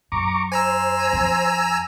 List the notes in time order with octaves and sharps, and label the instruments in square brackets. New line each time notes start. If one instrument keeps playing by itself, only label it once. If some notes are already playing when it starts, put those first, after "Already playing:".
[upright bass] F#2 [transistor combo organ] A#5 C#6 D6
[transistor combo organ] C5 [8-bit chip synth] G#5 A#5 E6
[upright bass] F2